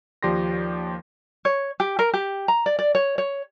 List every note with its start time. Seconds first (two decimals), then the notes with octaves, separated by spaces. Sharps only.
0.23 D#2 F3 G4 D5 C6 A#6
1.45 C#5
1.80 G4
1.99 A#4
2.14 G4
2.48 A#5
2.66 D5
2.79 D5
2.95 C#5
3.18 C#5